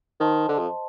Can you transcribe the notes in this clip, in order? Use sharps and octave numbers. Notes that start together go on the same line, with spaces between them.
D#3 C5 D#5 A5 C6
D3
F2